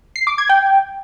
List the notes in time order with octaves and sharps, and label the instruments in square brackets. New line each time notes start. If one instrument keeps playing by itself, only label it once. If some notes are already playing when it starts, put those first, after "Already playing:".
[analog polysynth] C7
D6
G#6
G5